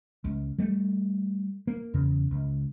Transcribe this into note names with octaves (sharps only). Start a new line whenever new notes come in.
C#2
G3 A3
A#3
E2 C#3
C#2